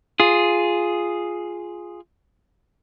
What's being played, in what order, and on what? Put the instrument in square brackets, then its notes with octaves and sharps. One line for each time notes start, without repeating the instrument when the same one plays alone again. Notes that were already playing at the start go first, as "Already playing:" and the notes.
[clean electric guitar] F4 G#4